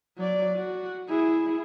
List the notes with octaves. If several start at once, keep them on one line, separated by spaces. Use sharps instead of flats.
F#3 D5
F#4
E4 G#4